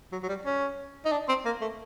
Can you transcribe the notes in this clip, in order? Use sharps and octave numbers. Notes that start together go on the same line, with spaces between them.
F#3
F#3
G3
C#4
D#4
D4
C4
A#3
A3